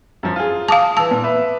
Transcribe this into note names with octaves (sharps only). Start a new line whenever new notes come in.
F#2 F3
F4 G#4
F5 A5 D6 D#6
E3 A5 E6
A#2
B4 E5